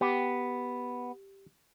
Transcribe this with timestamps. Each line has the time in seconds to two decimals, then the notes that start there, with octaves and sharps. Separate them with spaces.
0.01 B3 G4